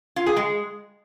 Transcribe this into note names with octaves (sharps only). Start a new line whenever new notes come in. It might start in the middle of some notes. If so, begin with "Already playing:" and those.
F4
G#4
G#3